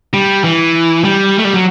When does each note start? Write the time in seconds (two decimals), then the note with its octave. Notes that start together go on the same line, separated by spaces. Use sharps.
0.14 G3
0.44 E3
1.04 G3
1.39 A3
1.45 G3
1.54 F#3